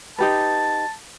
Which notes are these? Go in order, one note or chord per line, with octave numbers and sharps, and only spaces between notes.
D#4 G4 B4 A5